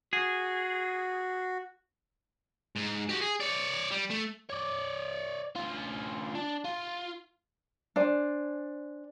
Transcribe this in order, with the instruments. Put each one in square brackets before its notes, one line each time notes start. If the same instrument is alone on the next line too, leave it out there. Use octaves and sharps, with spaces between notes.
[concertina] F#4 [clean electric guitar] G#4
[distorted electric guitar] G#2
F#4 G4
G#4
C#5 D5
G3
A3
[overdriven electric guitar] C#5 D5
D2 F4
D4
F4
[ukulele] D4 C5 G#5